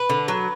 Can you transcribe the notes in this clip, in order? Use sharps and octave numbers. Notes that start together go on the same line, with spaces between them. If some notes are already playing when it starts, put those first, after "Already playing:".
Already playing: B4
D3
F#3